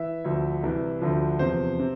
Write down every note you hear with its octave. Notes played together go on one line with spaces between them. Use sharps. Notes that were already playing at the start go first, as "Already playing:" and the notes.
Already playing: E3 E5
D2 D3 F3
C2 C3 E3
D2 D3 F3
E2 C3 F3 C5
C3